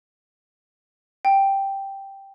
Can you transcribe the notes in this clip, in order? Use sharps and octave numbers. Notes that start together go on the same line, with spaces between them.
G5